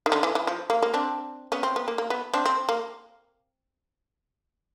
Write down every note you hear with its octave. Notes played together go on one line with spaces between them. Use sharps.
D#3
D3
E3
E3
F3
A#3
A#3
C4 D4
B3 C#4
C4
B3
A#3
A#3
B3
C4 D4
C4
A#3